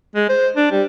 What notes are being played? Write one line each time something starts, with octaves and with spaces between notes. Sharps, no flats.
G#3
C5
D4
G3